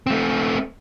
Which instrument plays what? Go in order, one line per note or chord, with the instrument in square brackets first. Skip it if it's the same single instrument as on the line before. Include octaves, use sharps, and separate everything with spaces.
[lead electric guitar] A3 C4